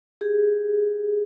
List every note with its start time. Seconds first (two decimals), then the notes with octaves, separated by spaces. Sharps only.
0.21 G4 G#4